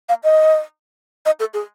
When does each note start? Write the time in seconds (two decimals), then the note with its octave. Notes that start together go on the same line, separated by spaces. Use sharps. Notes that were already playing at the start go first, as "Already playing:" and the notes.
0.09 F5
0.24 D#5
1.26 D#5
1.40 A4
1.54 G#4